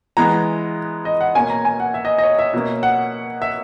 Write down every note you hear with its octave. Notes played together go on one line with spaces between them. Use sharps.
E3 G#3 B3 A#5
D#5
F#5
B2 A#3 C#4 G#5
A#5
G#5
F#5
E5
D#5
D#5
C#5
E5
B2 A#3 C#4
F#5
E5